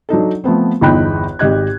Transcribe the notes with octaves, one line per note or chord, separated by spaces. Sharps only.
F#3 D4 D#4 A4
F3 A3 B3 C4
G1 E2 D#4 G5 B5 F#6
G#1 G4 D#5 F#6 G#6